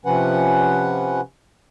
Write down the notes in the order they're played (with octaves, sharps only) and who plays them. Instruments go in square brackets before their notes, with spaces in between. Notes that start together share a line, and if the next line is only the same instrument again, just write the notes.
[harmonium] C3 F3 C#4 B4 F#5